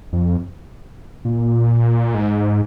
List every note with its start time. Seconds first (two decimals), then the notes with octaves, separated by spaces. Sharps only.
0.13 F2
1.25 A#2
2.14 G#2